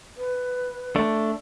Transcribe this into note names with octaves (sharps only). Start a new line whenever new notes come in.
B4
A3 D4